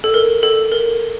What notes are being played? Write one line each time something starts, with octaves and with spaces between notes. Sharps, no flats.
A4
A#4
A4
A#4